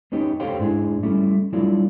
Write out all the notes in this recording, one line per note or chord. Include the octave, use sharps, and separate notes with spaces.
B3 C#4 D#4 G4
G4 A4 C5 C#5 F5 G5
G#2 D4 E4 G#4
G3 A3 C#4 E4
F#3 G3 A3 D4 E4 F4